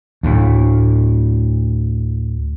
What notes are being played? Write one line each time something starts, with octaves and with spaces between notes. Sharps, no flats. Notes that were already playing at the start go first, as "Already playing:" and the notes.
D2 A2